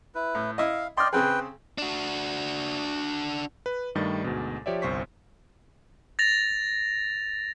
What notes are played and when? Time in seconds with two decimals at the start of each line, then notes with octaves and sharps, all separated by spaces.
0.15 E4 B4
0.35 A2
0.58 E4 D#5 F5
0.97 D5 D#5 G5 C6 F6
1.13 C#3 C4 G#4 B4 G5
1.78 D4 F#4
3.66 B4
3.95 G2 D#3 G3 A3 D#5 A6
4.24 D2 G#2 B2
4.66 F3 G4 C#5 D5 E5
4.82 G1 C2 C5 C#6 B6
6.19 A6 A#6 F7